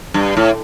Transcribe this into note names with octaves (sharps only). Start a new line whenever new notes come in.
G2
A2